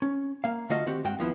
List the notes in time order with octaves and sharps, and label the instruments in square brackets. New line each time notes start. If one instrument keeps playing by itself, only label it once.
[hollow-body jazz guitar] C#4
A#3 F5
D3 A3 F4 F#4 D#5 F5
D#3 C4 F#4 G4
G2 G#3 F#4 F5 G5
D#2 F3 B3 E4